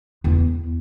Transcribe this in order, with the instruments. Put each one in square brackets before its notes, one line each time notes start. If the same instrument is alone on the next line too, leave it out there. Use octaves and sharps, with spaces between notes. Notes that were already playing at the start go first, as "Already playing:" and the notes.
[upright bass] E2 B3